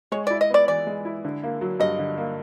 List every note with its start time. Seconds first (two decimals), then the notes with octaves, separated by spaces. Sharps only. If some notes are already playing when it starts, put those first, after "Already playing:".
0.12 G#3 C#5
0.27 E4 D5
0.41 D#5
0.50 B3 D5
0.68 E3 D5
0.87 G#3
1.05 E4
1.25 D3
1.44 A#3
1.61 F#3
1.80 G2 D#5
1.99 D3
2.18 A#3